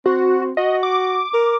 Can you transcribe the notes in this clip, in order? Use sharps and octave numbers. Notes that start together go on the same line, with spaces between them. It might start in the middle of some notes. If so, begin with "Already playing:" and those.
C4 F#4
F#4 D#5
D6
A#4